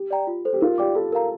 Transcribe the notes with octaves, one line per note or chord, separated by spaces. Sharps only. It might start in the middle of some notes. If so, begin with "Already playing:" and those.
Already playing: G4
D5 G5 A#5
F4
A4 C5
G4
F4 A#4
G4 D5 G5 D6
F4 A4
A#4 F5 A#5